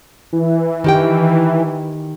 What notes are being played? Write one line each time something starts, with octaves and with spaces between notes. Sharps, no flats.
E3
D#3 G4 G5